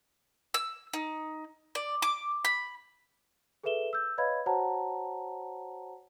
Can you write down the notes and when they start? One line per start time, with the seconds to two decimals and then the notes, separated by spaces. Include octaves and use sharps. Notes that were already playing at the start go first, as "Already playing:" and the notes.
0.54 E6
0.93 D#4
1.75 D5
2.02 D6
2.45 B5
3.63 G#4 A4 B4 E5 E7 G7
3.93 E6 G6
4.18 B4 C#5 D#5 F5 B5 G#6
4.46 F#4 C5 C#5 F#5 A5 A#5